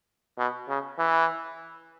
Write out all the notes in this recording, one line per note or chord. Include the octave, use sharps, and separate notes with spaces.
B2
C#3
E3